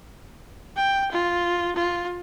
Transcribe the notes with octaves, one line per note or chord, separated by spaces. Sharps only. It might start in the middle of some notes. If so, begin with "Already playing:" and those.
G5
F4
F4